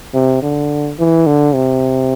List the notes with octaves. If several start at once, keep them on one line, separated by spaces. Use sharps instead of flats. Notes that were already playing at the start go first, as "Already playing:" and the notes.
C3
D3
E3
D3
C3